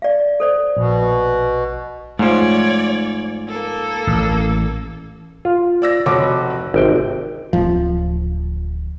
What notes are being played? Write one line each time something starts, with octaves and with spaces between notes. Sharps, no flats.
D5 F5
A4 C5 D5
A#1 B2
G#2 F3 A3 C#5 D5
A#3 A4
A1
F4
D5 E6 A#6
F1 F#4 C#5 D6
G#1 C3 G5
D1 F3